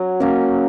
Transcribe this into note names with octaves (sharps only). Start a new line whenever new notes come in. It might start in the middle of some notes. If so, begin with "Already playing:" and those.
Already playing: F#3
A#3 C#4 A#4